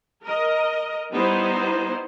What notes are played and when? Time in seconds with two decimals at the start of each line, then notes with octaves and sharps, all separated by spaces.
0.24 A#4 D#5
1.13 G3 B3 D#4 E4 C5